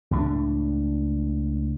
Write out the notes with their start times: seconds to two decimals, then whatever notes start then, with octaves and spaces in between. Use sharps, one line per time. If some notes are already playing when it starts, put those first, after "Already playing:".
0.11 C#2 A2 G#3 D4